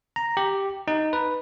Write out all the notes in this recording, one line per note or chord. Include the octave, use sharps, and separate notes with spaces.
A#5
G4
D#4
B4